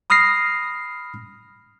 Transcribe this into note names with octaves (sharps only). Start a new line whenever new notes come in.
B5 D#6 F6 A#6 C7